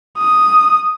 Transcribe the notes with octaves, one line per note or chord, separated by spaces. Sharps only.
D#6